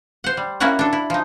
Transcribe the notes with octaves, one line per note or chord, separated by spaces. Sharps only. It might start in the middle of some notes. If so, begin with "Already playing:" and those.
C5 F#5
G3
A#3 C#4 E4 F#4 C#5 F#5
D4 A4
E4
F3 D#4